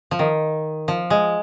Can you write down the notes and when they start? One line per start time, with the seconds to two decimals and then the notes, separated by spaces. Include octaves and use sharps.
0.11 F3
0.19 D#3
0.88 F3
1.10 G#3